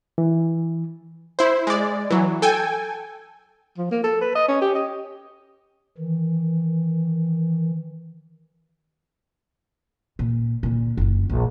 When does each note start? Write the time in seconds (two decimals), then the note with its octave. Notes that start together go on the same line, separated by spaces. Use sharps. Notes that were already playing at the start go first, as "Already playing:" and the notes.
0.18 E3
1.39 E4 C5
1.67 G#3 D5
2.10 E3 F#3
2.42 A4 G5 G#5
3.78 F3
3.91 A#3
4.04 A4
4.21 B4
4.36 D#5
4.48 C#4
4.62 G4
4.75 D#5
5.98 D#3 E3
10.19 A#2
10.63 A#2 D3
10.97 F#1 D3
11.30 A#1